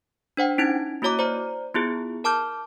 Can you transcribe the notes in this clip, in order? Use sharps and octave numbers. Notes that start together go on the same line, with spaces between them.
D4 C5 F#5 G5
C#4 D#4 E4 G#6 D7
A#3 E4 F#4 C#5 A#5 D6
C5 D5 A#5
B3 E4 F4 G#4
A#4 A5 D6 F6 G6